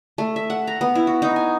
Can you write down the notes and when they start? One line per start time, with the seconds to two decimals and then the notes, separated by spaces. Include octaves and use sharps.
0.18 A3
0.36 E5
0.50 F#5
0.67 A#5
0.81 B3
0.95 E4
1.07 F#4
1.22 D#4
1.36 G#5